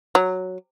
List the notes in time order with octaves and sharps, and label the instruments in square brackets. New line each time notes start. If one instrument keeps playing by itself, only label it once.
[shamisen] F#3